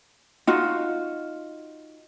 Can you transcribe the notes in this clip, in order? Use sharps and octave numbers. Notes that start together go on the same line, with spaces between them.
D#4 F4 F#4